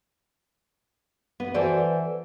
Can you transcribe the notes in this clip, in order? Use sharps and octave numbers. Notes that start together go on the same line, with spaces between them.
B3
E3 F#4 A4 C5 D5